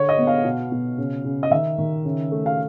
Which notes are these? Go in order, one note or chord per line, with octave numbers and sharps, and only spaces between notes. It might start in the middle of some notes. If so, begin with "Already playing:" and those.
Already playing: D3 C#5
D#5
B3
F5
B2
B2
C#3
C#3
D#5
D#3 E5
D#3
C#3
A3
F5